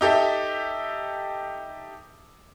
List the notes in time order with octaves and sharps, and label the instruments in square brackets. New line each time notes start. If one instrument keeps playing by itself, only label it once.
[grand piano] D#4 G4 A4 E5